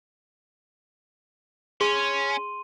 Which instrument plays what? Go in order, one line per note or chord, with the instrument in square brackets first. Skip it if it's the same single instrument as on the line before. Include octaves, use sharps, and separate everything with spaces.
[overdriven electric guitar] C#4 [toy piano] G#4 [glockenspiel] C6 D#7